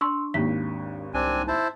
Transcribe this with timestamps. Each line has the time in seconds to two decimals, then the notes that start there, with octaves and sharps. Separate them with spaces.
0.01 D4 C6 C#6 E6
0.34 G#1 D#2 B6
1.14 C2 C4 D4 G#5
1.48 E4 C5 A5